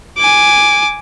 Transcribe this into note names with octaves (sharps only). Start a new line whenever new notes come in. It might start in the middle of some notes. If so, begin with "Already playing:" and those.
G#5 D6